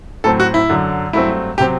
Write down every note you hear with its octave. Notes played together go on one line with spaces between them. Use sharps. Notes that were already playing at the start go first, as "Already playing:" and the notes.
A2 F#3 C4 A4
F#4
E4
F#2 D3 F#3
G2 F#3 A3 C4 E4
C3 F#3 C4 G4